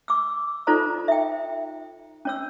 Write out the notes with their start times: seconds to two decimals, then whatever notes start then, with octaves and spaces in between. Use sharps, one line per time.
0.08 D6 E6
0.67 D#4 F4 A4 C5 D5 A#5
1.08 E5 G5
2.25 C#4 C#5 E6